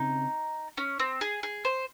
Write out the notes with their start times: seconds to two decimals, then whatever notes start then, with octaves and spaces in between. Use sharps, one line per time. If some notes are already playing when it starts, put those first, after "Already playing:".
Already playing: C#3 C4 D#4
0.77 C#4
0.99 C4
1.21 G#4
1.43 G#4
1.65 C5